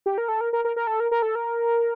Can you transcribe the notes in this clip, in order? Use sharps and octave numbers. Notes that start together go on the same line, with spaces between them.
G4
A#4
A4
A#4
A#4
A#4
A#4
A4
A#4
A#4
A4
A#4